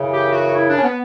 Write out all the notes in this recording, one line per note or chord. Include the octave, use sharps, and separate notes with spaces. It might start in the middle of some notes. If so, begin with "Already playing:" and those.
Already playing: F#2 C#3 E3
G4
F#4
E4
D4
C#4
B3